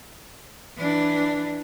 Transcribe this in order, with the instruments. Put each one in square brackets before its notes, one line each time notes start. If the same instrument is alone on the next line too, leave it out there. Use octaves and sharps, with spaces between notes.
[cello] E3 D4